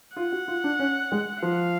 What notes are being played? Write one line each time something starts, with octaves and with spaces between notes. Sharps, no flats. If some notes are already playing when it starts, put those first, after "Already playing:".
F4 F#5
F#4
F4
D4
C#4
G#3
F3 F5